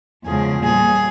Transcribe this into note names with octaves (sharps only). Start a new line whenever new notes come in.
E2 C#3 F3 G#3 G#4
A#2 G3 G#4